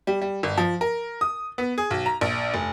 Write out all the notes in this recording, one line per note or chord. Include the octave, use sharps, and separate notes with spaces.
G3
G3
G1
F3
A#4
D#6
B3
G#4
B1
A#5
A#1
F1